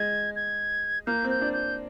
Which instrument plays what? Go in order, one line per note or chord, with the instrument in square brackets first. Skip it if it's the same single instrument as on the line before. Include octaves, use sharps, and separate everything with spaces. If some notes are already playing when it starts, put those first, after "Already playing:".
Already playing: [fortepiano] G#3 [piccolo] G#6
[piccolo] G#6
[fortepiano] A#3 [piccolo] G6
[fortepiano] C4
[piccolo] G6
[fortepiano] D4
[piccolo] G6